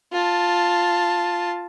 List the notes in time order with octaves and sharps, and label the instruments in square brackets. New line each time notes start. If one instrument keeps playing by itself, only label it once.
[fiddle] F4 A5